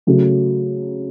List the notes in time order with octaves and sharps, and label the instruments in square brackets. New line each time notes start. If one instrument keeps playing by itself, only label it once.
[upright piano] C#3 F#3 A3